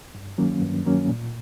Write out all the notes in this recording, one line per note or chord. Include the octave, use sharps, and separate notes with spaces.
G2
D#3 F#3 A#3 C#4
G2
D#3 F#3 A#3 C#4
A#2